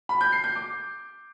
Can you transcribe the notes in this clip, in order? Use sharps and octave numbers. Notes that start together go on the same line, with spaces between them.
B5
G6
C7
G6
D6